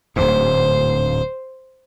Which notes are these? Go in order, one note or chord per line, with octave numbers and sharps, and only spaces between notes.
D1 D2 G#2 C5